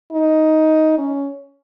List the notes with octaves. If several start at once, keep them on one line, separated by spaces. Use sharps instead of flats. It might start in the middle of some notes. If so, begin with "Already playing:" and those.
D#4
C#4